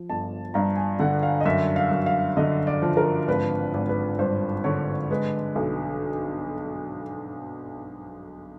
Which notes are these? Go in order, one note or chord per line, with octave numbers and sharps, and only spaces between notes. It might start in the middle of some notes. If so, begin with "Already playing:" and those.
Already playing: F3
G1 A5
G2 A#5
G#5
D3 F#5
F5
D#5
F#2 E5
F5
F#2
F5
D3 D#5
D5
F3
A#4
G#1 B4
G#1
B4
G2 C5
D3 C#5
G#3 B4
B1